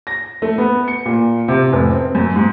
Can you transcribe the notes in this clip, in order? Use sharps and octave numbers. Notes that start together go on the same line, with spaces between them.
A#6
A3
B3
C#7
A#2
C3
F1
C4
F#2
G#2